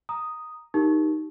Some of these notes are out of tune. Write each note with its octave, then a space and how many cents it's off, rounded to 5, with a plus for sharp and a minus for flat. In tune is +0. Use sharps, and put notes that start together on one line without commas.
A#5 +0 D#6 +0
D#4 +0 G4 -10 A#4 +0